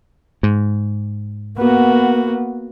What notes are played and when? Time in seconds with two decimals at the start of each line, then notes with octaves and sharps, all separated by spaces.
0.43 G#2
1.58 A#3 B3 F#4